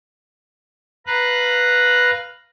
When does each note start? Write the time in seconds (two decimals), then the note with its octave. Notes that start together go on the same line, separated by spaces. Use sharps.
1.06 B4 F5 A#5 F#6